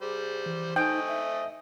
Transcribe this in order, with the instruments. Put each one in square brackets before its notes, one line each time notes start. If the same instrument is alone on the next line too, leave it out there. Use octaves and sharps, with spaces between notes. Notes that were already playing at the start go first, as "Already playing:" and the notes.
[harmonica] G3 C5 [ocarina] G#4
[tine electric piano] E3
[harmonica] A3 A4 D#5 [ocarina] D#4 [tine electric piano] C5 G#5 [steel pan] G5
[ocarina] E5